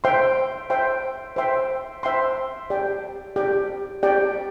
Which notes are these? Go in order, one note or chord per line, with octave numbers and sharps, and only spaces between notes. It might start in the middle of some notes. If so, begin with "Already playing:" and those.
C5 E5 G5 C6
C5 E5 G5 C6
C5 E5 G5 C6
C5 E5 G5 C6
G4 D5 G5
G4 D5 G5
G4 D5 G5